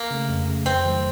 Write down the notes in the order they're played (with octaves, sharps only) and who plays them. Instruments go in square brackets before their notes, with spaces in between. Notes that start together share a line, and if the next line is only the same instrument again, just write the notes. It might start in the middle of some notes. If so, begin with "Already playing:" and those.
Already playing: [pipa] A#3
[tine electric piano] C#3 A3
F2
C#3 A3
[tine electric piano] F2 [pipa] C4
[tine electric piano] D#3 F#3 A3